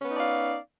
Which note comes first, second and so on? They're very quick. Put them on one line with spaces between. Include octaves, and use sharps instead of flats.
C#4 B3 D#4 D5 F5